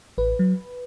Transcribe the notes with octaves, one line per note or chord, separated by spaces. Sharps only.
A1 B4
F#3